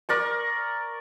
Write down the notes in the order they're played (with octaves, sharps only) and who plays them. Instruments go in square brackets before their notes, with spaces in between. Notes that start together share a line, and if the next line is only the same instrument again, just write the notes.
[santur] A#4 D5 C#6